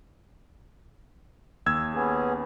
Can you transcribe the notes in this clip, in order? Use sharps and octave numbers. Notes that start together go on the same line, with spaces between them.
D#2 E6 G#6
B3 C#4 G#4